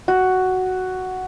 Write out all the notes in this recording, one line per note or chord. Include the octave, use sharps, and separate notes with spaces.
F#4